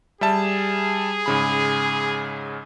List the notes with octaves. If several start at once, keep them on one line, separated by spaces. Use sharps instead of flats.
G3 G#4 E5 A5
G#2 C#3 B5